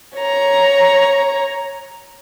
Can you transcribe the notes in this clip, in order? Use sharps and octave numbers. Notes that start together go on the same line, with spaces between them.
C#5 A#5